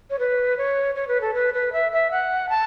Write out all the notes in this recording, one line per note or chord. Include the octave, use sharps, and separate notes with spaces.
C#5
B4
C#5
C#5
B4
A4
B4
B4
E5
E5
F#5
A5